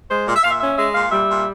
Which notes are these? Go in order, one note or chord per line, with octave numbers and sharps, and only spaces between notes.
G#3 C5
A#2
E5
A#2 F5
E5
C#4 E5
G#3 E5
A#2 F5
G3 E5
A#2